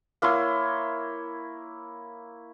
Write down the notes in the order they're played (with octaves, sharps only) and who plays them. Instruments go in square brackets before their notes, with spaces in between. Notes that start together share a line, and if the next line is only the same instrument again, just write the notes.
[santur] A#3 E4 C#5 C6